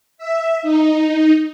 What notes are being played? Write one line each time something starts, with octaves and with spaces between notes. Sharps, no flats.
E5
D#4